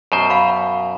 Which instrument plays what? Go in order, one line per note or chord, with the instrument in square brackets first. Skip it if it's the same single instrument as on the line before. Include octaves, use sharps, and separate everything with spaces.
[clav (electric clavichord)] F#2 B2 C5
[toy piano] F5 B5